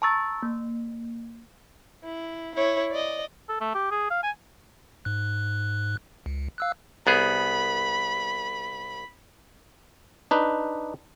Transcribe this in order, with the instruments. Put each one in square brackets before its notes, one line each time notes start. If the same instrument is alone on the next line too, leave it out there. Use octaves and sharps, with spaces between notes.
[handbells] A5 A#5 C#6 E6 A6
A#3
[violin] E4
E4 C#5
D5 D#5
[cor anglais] A4
A3
G4
G#4
F5
G#5
[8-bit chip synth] G#2 F#6
C#2
F5 E6 F#6
[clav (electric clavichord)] C2 B3 G#4 [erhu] B5
[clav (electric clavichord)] D4 D#4 B4